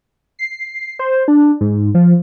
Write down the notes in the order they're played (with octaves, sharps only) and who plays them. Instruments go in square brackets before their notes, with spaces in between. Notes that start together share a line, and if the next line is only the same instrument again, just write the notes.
[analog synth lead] C7
C5
D4
G#2
F3